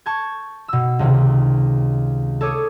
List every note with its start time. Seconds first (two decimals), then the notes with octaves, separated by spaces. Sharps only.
0.06 A5 C#6 G6 G#6
0.68 B2 E6
0.99 C#2 C3 D#3
2.41 A4 C#5 D6 D#6 G#6